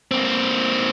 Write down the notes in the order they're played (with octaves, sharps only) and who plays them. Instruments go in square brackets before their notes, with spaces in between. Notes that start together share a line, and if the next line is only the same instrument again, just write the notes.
[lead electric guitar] A#3 C4